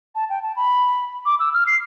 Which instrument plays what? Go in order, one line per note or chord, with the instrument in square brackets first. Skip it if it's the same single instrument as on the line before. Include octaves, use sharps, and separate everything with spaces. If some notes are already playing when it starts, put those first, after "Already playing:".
[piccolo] A5
G5
A5
B5
D6
E6
F6
C7